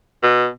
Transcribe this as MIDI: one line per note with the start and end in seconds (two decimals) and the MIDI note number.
0.23 0.46 47